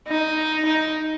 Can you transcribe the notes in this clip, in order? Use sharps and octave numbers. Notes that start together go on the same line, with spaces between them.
D#4
D#4